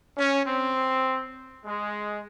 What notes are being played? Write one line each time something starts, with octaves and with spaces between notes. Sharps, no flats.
C#4
C4
G#3